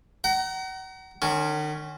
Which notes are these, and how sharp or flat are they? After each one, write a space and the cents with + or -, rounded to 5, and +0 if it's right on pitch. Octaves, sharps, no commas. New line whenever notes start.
F#5 +40 A#5 +0
D#3 -45 C#4 +0